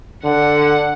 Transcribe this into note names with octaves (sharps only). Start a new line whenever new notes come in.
D3 F#5